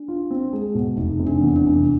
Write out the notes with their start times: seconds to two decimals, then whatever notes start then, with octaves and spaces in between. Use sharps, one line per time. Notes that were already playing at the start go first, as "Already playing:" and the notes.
Already playing: D4
0.08 F4
0.31 C4
0.53 G#3
0.75 B2
0.97 F1 D#4
1.20 C3
1.27 D4
1.41 E2
1.56 D4
1.64 F1